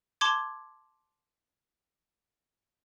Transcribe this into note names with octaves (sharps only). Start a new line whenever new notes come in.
A5 C6 D6 G#6